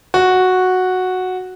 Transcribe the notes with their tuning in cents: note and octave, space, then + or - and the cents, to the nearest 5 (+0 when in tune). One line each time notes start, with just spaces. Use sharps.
F#4 -5